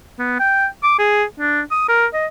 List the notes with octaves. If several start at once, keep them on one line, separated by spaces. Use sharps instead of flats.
B3
G5
D6
G#4
D4
D#6
A#4
D#5